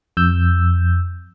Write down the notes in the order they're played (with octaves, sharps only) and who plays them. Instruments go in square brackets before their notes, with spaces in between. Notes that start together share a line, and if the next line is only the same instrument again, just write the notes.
[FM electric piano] F2 E6 G6